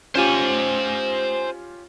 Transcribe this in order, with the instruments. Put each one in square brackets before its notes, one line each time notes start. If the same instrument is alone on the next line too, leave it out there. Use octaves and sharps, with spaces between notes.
[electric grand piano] C#4 F4 G4 [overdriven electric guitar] C5 G#5